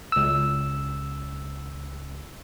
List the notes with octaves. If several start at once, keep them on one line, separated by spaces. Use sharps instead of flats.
C#2 E6